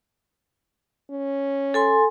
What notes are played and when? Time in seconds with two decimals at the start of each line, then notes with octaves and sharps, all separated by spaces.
1.10 C#4
1.74 A4 G#5 C6